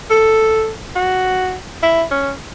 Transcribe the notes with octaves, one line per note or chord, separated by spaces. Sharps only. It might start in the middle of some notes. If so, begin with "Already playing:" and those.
A4
F#4
E4
C#4